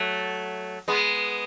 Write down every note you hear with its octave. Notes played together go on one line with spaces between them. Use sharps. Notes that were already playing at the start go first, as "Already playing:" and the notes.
Already playing: F#3 A3
G#3 B3